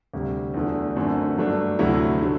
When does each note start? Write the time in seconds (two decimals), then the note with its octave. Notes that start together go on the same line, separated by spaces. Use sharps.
0.14 D2 C3 G3
0.54 E2 D3 F#3 A3
0.96 F#2 D3 F#3 A3 C4
1.38 G2 F#3 A3 D4
1.79 D2 C3 F#3 A3 E4
2.22 D3 A3